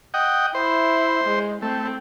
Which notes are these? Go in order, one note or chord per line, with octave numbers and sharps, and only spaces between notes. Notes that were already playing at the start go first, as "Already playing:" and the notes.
D#5 F#5 G5
E4 C5
G#3
A3 C4